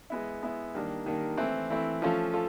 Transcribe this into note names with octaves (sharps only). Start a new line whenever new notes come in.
G#3 B3 E4
G#3 B3 E4
D#3 G3 A#3 D4
D#3 G3 A#3 D4
E3 A3 C4 E4
E3 A3 C4 E4
F3 A3 C#4 F4 A4
F4 A4